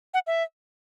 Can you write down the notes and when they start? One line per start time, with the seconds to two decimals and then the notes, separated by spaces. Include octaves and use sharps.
0.14 F#5
0.27 E5